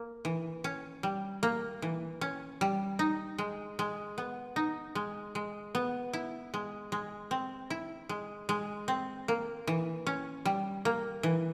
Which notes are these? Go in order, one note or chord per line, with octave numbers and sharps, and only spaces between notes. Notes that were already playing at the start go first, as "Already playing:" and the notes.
Already playing: A#3
E3
C#4
G3
A#3
E3
C#4
G3
D#4
G#3
G#3
B3
D#4
G#3
G#3
B3
E4
G#3
G#3
C4
E4
G#3
G#3
C4
A#3
E3
C#4
G3
A#3
E3